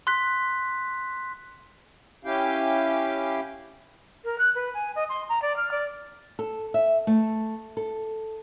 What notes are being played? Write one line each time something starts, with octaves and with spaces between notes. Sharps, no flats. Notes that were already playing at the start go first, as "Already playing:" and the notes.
C6 F#6 B6
C#4 E4 G4 F5 G5
A#4
F#6
B4
G#5
D#5
C6
A#5
D5
F6
D5
A4
E5
A3
A4